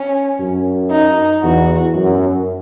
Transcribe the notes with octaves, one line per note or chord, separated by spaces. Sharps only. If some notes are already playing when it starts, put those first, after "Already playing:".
Already playing: C#4
F#2
D#4
E2 F#4
F#2